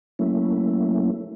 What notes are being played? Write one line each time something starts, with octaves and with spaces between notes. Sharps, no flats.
F#3 A3 A#3 C#4 E4